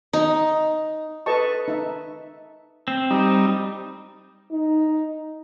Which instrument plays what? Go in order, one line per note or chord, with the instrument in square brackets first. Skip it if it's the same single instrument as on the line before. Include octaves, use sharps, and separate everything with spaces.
[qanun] D#4
[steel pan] A4 B4 D#5 A5 C#6
D#4 E5
[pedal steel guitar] C4
[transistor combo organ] G3 D#4
[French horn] D#4